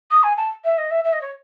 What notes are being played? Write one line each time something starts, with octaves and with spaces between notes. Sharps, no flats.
D#6
G#5
A5
E5
D#5
E5
E5
D#5
C#5